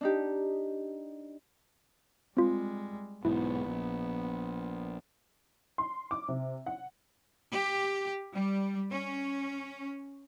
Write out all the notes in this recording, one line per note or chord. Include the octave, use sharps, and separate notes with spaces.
D4 D#4 G4
G3 G#3 C4 F4
B1 G#2 B3 E4
A#1
C6
D6
C3
F#5
G4
G3
C#4